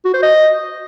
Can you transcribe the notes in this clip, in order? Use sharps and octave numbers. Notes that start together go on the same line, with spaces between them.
F#4
C5
D#5